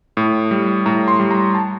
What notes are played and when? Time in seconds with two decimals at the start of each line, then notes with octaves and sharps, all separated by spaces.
0.17 A2
0.51 G3
0.86 A2 A#5
1.08 C6
1.19 G3
1.31 A#5
1.55 A5